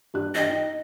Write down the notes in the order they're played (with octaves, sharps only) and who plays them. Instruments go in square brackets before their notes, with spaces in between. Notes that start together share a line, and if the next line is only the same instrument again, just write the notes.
[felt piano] G2 G3 F#6
[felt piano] D4 G5 [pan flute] D#5
[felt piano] D#4